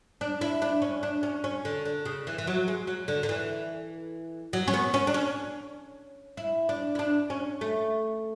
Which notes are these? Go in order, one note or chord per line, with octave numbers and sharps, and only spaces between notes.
D4
E4
D4
C#4
D4
C#4
C#4
D3
D3
C#3
E3
E3
F#3
G#3
F#3
D3
D3
E3
F#3
C#4
B3
C#4
D4
C#4
E4
D4
E4
D4
C#4
A3